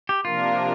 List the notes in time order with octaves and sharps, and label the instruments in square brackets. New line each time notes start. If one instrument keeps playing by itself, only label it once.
[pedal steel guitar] G4
[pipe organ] C3 F3 A#3 D4 A#4 [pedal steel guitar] F4